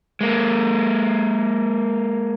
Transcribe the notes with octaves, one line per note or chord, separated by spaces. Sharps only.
G#3 A#3